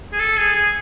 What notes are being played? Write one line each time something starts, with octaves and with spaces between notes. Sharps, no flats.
G#4
A4
G#4
G#4